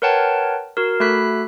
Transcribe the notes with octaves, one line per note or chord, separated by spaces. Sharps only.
A#4 B4 C#5 F#5 G5 A5
F#4 A#4
A3 F#4 A4 B5 F#6 B6